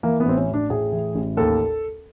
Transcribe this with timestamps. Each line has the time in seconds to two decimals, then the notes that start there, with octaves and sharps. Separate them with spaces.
0.03 E3 A#3
0.20 B3
0.25 A1 C4
0.37 C#4
0.48 A1
0.54 D4
0.70 A2 G#4
0.92 E3
1.15 A1
1.37 D#2 A4